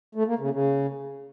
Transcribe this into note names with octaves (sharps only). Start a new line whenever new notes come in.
A3
A#3
C#3
C#3